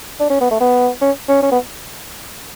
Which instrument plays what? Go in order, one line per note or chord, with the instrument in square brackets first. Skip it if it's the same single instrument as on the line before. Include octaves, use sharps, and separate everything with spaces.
[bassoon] D4
C#4
B3
A3
B3
C#4
C#4
C#4
B3